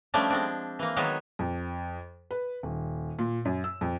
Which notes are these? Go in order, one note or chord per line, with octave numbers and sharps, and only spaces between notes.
F3 G3 A3 C#4 D4
G#3 C4 D4
E3 A#3
D#3 F#3 G#3 B3
F2
B4
D#1
A#2
F#2
E6
F2